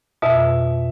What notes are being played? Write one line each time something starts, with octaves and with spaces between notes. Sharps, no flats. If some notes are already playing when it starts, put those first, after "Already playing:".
F2 B2 E5